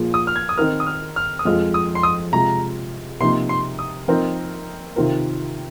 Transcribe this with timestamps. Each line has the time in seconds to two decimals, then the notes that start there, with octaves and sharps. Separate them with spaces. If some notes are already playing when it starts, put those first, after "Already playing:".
Already playing: A#2 F3 A#3 F4 G#4
0.14 D#6
0.27 F6
0.36 G#6
0.49 D#6
0.58 D#3 C4 D#4 A#4 F6
0.80 D#6
0.86 F6
1.16 F6
1.39 D#6
1.45 F2 F3 G#3 F4 F6
1.74 D#6
1.95 C6
2.03 D#6
2.32 C3 G#3 F4 A#5
3.20 C3 F3 A#3 D#4 C6
3.49 C6
3.79 D#6
4.08 F3 C4 D#4 A#4
4.96 C3 D#3 C4 F4 A#4